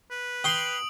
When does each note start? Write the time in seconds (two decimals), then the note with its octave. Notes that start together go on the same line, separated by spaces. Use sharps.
0.11 B4
0.44 G5 C6 D#6 D7 F#7